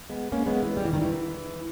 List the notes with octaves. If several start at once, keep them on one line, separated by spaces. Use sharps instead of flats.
G#3 B3
A#3 C#4
G#3 B3
E3
G3
E3
D#3
E3